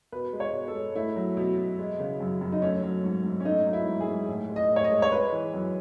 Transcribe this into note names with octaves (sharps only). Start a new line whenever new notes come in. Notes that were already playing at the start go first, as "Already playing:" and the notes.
B2 B4
G#3
C#5
B2
A4
G#3
A3 E4
F#3
B2
B2
G#3
C#3
F#2
F#2
D#4
A3 C#4
F#3
G#2
G#2
C#4
A3 D#4
F#3 D#4
E4
G#2
G#4
G#2
A2
G#3
D#5
A2
C#5
D#5
G#3
C#5
G#3 B4
E3
F#2